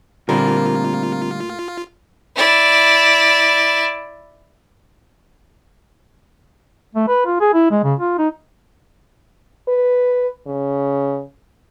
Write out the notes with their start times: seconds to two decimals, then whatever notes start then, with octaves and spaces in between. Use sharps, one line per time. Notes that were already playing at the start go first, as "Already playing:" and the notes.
0.29 A#2 D3 G3 A3 A#3 C4 F4 A#4
2.36 E4 D5
6.95 A3
7.08 B4
7.26 F4
7.41 G#4
7.54 E4
7.71 G#3
7.84 C#3
7.99 F4
8.18 D#4
9.68 B4
10.47 C#3